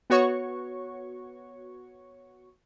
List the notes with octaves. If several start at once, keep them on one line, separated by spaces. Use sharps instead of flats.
B3 F#4 C#5 C#6